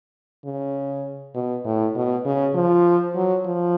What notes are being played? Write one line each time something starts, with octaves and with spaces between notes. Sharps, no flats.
C#3
B2
A2
B2
C#3
F3
F#3
F3